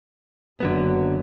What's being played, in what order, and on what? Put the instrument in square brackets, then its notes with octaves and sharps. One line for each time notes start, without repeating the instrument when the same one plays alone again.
[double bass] F#1 [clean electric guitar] D3 F#3 B3